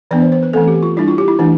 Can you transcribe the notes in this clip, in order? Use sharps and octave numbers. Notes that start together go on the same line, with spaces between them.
E3 B3 D4 D5
C5
C5
B4
E3 A3 C4 A4
G4
F4
G3 D4 E4
F4
G4
E4
E3 A3 D4